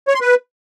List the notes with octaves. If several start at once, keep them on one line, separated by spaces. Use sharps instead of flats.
C#5
C6
B4